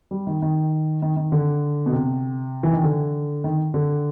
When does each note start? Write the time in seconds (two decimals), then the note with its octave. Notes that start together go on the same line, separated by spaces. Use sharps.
0.11 G3
0.27 D#3
0.42 D#3
1.02 D#3
1.17 D#3
1.32 D3
1.86 B2
1.92 C3
2.63 E3
2.73 D#3
2.83 D3
3.44 D#3
3.74 D3